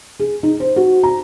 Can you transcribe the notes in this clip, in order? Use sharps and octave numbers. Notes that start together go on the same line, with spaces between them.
G#4
D#4
C5
F#4
A#5